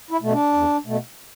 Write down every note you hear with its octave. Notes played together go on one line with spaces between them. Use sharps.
E4
B2 A3
D4
E2
B2 A3